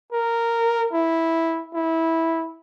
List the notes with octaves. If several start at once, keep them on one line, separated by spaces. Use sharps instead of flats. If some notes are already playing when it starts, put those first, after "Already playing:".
A#4
E4
E4